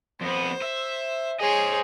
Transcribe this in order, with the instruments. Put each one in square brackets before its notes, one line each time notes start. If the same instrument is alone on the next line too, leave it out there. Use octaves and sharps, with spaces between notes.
[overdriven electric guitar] F2 B3 [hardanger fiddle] C5
[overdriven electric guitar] E5
[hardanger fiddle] G#4 C#5 [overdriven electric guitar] C5 D#5